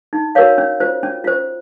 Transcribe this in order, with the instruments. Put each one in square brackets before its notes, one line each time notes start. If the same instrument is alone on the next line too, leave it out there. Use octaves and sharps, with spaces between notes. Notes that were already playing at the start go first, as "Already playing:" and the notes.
[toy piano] D#4
F#4 A#4 C#5 F5
C#4
F4 C5
C#4
F4 C5